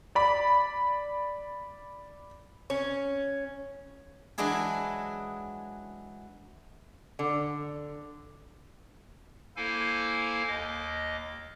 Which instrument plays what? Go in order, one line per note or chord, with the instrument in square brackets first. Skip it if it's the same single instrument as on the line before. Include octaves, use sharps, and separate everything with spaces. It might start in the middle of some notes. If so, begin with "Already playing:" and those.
[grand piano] D5 B5
[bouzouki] C#4
[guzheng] E3 F#3 G#3 D4 E4 G#4
[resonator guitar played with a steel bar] D3
[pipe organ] A#3 E4 A4 C5 F5 G#5
D#2 D#5 D6